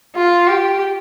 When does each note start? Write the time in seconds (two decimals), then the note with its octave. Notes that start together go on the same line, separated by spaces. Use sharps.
0.16 F4
0.48 G4